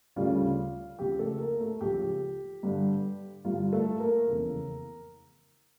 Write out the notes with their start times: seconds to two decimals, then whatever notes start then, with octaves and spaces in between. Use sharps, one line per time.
0.16 D2 C#3 G3 C#4 F4
0.98 C#2 C#3 F3 G4
1.19 A3 A4
1.40 A#3 A#4
1.60 A3 A4
1.81 C#2 C#3 F3 G4
2.63 G2 D3 G3
3.45 G2 D3 G3 F4
3.72 A3 A4
4.00 A#3 A#4
4.27 F1 E2 C#3 E3 A#3